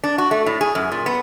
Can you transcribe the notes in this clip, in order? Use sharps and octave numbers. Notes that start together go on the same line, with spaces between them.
D4
F#4
A3
A2
G#4
F#2
A#2
B3